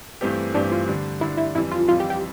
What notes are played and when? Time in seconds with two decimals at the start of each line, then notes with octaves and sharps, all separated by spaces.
0.21 G2 E3 A3 C4 G4
0.54 G2 E3 A3 C4 D4 G4
0.72 F4
0.88 D3 G3 D4
1.21 D3 G3 D4 E4
1.37 E4
1.55 F2 E3 G3 E4
1.71 F4
1.88 F2 E3 G3 F4
2.00 G4
2.10 G4